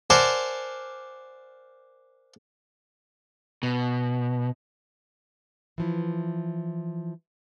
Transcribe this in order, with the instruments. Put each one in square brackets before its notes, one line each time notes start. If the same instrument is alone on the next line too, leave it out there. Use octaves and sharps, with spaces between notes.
[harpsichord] A#4 C5 D5 F#5 G#5 A5
[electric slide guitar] B2
[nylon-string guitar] E3 F3 E4